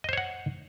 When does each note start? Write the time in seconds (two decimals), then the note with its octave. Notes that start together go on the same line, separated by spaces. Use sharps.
0.04 D#5
0.09 C5
0.13 C#5
0.17 F#5